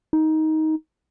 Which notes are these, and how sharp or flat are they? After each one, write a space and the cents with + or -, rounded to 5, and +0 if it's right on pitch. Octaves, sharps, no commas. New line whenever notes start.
D#4 +15